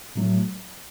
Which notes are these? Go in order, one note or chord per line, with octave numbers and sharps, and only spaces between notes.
A2 F#3 A3